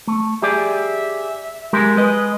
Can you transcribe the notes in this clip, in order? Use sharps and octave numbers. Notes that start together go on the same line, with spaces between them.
A3
G4 G#4 D5 E5
G#3 G4 A#4
G#3 B4 D#5